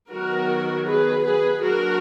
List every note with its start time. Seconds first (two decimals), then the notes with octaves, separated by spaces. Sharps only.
0.10 D#3 F#3 B3 F#4 A#4
0.87 G#4 B4
1.24 G#4 B4
1.62 F#3 A#3 D4 F#4 A#4